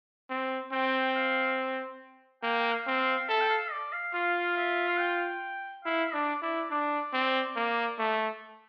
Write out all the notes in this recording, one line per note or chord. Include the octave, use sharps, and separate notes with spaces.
C4
C4 G5
F5
A#3 G5
G5
F5
C4
F5
A4 E5
G5
F5
D5
F5
F4 F5
E5
F5
G5
E4 F5
D4 D5
E4 D5
D4 D5
C4
A#3
A3